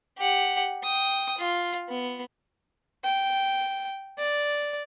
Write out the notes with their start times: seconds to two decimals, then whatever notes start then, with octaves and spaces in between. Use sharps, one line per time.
0.18 G4 F#5
0.83 G5 D#6
1.38 F4
1.89 B3
3.04 G5
4.18 D5